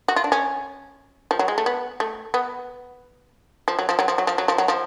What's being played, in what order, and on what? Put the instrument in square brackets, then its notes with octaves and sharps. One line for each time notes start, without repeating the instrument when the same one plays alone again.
[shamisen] F#4
F4
D4
C#4
F3
F#3
G#3
A3
B3
A3
B3
F3
F#3
F3
F#3
F3
F#3
F3
F#3
F3
F#3
F3